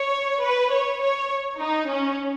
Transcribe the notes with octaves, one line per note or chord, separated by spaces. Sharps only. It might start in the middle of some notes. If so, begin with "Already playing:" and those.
Already playing: C#5
B4
C#5
C#5
D#4
C#4